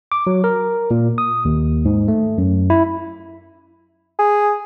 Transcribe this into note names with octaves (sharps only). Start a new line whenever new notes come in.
D6
F#3
A#4
A#2
D#6
D#2
G#2
A3
F#2
E4
G#4